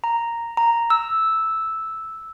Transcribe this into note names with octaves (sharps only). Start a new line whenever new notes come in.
A#5
A#5
E6